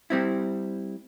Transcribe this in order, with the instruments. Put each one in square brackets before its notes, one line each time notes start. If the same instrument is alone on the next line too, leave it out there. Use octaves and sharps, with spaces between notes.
[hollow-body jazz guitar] G3 C4 E4